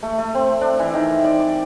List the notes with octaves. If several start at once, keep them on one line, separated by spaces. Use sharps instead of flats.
A3
A3
C4
D4
E3
D#3
D5
D6